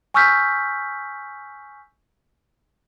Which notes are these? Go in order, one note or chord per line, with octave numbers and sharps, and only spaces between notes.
G#5 C#6 E6 F6 G6 B6